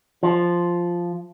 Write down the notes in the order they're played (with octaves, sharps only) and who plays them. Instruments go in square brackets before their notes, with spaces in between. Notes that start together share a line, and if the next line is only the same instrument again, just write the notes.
[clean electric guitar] F3